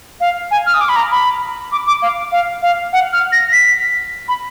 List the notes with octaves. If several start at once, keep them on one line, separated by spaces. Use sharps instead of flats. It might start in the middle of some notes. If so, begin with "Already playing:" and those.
F5
G#5
F6
D#6
D6
B5
A#5
B5
D6
D6
F5
F5
F5
F#5
F6
A#6
B6
B5